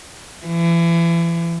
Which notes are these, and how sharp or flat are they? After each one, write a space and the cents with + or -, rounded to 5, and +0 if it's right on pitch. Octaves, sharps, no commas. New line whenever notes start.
E3 +35